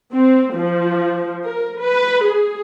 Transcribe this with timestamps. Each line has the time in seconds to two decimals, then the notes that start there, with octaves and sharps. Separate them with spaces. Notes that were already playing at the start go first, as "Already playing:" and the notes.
0.14 C4
0.55 F3
1.45 A#4
1.81 B4
2.24 G#4